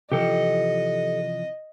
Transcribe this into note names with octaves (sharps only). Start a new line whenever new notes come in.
C3 E3 F3 G4 A4 D#5